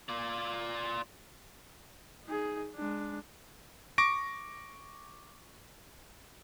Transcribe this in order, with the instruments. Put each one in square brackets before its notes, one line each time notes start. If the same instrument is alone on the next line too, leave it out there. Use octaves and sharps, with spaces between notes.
[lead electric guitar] F4 D5
[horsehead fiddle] D#4 G#4
G#3 D4
[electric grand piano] C#6 D6 A#6 D7